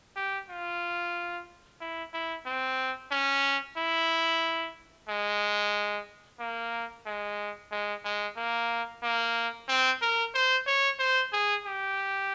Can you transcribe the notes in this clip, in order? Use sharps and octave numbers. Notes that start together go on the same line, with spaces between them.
G4
F4
E4
E4
C4
C#4
E4
G#3
A#3
G#3
G#3
G#3
A#3
A#3
C4
A#4
C5
C#5
C5
G#4
G4